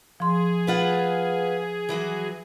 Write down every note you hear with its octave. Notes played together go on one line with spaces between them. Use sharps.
F3 G#4 C6
B3 F4 F#5
E3 F#3 F#4